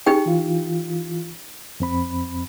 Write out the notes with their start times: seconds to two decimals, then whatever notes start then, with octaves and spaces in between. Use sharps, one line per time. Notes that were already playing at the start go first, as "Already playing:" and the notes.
0.06 D#4 G4 G#4 G5
0.26 E3 F4
1.80 F2 C4 B5